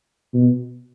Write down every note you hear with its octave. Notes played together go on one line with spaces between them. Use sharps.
B2